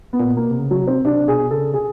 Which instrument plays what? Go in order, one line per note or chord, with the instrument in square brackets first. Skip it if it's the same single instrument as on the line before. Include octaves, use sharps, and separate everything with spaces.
[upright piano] B3
[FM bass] A#2
[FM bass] B2 [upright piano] A#3
[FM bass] C3
C#3
[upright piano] F#3
[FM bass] C3
[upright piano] C4
[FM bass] C3 [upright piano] D4
[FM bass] B2 [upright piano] G#4
[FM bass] C#3 [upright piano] A4
[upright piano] G#4